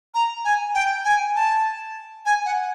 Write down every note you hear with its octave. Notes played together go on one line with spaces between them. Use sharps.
A#5
G#5
G5
G#5
A5
G#5
F#5